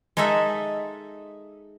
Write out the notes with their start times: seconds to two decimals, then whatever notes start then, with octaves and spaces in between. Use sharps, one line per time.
0.17 G#3 D#4 G#4 A4 E5